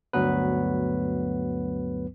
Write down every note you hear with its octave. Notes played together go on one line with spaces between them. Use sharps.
D2 G2 F#3 B3 B4